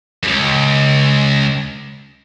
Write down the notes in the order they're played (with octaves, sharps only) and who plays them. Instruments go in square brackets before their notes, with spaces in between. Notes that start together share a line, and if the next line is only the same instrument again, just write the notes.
[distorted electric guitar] C#2 F#2